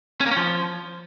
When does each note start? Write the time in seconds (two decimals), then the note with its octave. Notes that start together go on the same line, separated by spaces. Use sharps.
0.21 C#4
0.26 A#3
0.31 C#4
0.37 F3